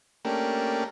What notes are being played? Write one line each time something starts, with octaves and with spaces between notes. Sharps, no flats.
A3 A#3 C#4 D4 G4 A#4